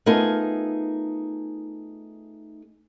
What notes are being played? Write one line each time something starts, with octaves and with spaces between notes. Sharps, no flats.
A3 B3 D#4 F4 G#4 A#4